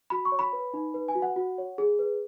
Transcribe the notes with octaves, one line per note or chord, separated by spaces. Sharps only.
F#4 B5
C#6
C#5
B5
B4
D#4
B4
G#5
F#4
F#5
F#4
C#5
G#4
B4